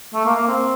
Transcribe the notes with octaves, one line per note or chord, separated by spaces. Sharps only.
A3
A#3
A#3
C4